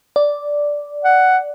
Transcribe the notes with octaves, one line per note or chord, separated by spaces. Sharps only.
D5
F#5